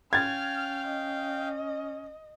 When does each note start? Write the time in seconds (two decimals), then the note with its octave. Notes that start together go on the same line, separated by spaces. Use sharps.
0.13 C#4 F5 G5 F6 G#6 A6
0.87 D#5